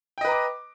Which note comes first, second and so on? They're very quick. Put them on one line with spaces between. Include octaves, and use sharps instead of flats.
G5 D#5 B4 A#5 D6